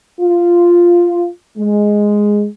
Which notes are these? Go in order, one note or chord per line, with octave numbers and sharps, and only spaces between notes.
F4
G#3